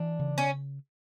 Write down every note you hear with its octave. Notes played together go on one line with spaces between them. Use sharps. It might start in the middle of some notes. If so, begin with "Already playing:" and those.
Already playing: E3 D4
C#3
C#4